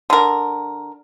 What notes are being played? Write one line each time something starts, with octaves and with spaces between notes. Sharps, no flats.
D3 A#4